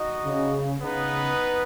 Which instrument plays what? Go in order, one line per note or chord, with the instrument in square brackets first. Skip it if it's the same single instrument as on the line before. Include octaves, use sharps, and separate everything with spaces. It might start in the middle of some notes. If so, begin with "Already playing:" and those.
Already playing: [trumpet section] D#4 F#4 D#5
[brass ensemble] C#3
[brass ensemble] C#3 [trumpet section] B3 D#4 B4